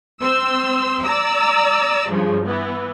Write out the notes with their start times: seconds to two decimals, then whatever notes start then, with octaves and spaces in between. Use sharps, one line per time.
0.21 C4 C6 E6
1.04 D5 A#5 E6
2.10 G2 C#3 F3
2.44 E3 B3